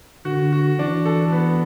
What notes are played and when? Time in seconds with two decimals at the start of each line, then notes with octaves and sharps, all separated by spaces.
0.25 D3 F#4
0.52 F#4
0.79 E3 D4
1.06 A4
1.32 B3